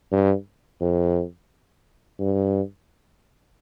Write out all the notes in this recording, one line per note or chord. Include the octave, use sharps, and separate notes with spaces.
G2
F2
G2